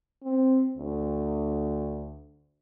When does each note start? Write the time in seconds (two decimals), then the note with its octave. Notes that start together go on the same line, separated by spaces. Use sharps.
0.24 C4
0.77 D2